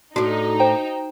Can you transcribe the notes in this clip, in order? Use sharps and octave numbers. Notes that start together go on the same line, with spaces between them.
A2 D4 D#4 F#4
C5 G5 A#5